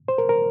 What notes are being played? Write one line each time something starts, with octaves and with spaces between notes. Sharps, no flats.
C5
A#4
A#4